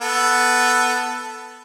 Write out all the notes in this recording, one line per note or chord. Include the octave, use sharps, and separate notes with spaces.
B3 A4